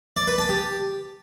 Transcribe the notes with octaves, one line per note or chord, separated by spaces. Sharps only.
D5
B4
A5
G4